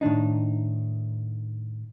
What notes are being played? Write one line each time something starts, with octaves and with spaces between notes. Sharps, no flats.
A2 D#3 D4 D#4